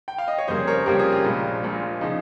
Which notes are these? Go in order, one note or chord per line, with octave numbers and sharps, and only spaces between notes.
G5
F5
D#5
C#5
F2 C#3 G3 A#3 G#4 C5
A#4 C#5
F2 C#3 G3 A#3 G4 A#4
F4 G#4
F4
A#1 A#2 G#3
A#1 A#2 G#3
C#3 F3 D#4